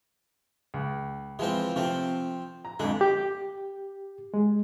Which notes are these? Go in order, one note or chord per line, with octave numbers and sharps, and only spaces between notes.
C#2
E3 F3 G#3 C4
C3 F3 A3 C4
A#5
F2 D3 G#3
G4
G#3